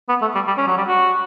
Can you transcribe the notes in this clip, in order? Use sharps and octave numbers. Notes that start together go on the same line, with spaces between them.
B3
A3
G3
G3
C#4
F#3
G3
F#4